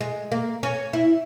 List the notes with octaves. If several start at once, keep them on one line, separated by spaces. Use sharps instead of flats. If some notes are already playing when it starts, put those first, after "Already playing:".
G#3
A#3
C#4
E4